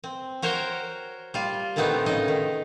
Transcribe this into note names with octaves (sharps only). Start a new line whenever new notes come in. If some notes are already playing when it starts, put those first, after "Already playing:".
C4
F#4 A#4 C5 C#5 G5
G3 F4
A#2 D#3 A3 B3 C4 D#4
A2 C#3 D#4 D#5
D#3